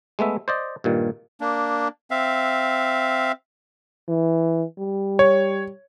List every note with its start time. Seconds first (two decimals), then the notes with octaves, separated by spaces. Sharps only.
0.19 G#3 A3 B3 E5
0.48 C5 D5 D#5
0.84 G2 A#2 D#3
1.41 A#3 D4
2.11 C4 E5 F5
4.08 E3
4.78 G3
5.19 C#5